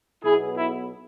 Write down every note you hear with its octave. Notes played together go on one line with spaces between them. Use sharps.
B1 B2 B3 E4 G#4
E4